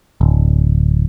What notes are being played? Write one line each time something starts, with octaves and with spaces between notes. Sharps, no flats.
D1